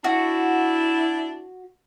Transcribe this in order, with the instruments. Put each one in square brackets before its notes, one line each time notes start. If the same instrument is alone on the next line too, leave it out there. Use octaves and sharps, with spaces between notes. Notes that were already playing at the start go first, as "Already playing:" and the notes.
[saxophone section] D4 E4 [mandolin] F#4